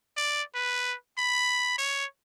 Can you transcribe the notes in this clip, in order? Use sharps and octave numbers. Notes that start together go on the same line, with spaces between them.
D5
B4
B5
C#5